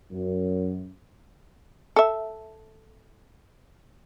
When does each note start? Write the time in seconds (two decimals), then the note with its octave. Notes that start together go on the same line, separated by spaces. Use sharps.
0.12 F#2
1.96 A4 E5